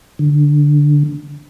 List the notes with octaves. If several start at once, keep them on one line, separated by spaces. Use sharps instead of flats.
D3